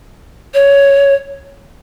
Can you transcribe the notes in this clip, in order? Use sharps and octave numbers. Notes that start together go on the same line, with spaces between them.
C#5